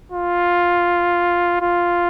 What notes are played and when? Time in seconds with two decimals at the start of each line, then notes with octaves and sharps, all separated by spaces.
0.12 F4
1.61 F4